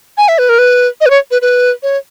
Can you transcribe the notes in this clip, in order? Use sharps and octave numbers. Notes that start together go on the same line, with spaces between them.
G#5
E5
B4
A#4
B4
D#5
B4
C#5
B4
B4
C#5